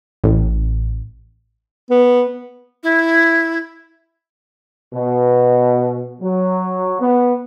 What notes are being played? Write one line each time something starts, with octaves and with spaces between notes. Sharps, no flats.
A1
B3
E4
B2
F#3
B3